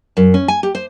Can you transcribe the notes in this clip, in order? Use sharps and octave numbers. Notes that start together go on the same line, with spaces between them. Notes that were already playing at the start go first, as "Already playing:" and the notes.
F#2
C#4
G#5
G4
C5